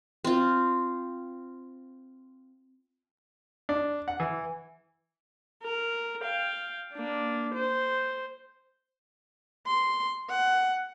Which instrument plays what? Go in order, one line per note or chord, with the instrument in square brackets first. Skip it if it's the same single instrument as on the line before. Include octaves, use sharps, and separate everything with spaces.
[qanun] C4 F4
[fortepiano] D4
F#5
E3
[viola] A#4
F5 G5
A#3 D4
C5
C6
F#5